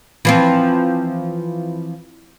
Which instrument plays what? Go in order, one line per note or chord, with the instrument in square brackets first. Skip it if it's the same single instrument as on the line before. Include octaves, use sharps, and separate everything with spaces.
[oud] E3 F3 C4